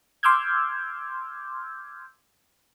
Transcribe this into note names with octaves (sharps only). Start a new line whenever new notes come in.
C6 D6 E6 F6 G6 G#6